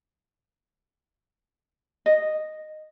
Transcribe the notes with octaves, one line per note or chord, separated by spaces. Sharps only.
D#5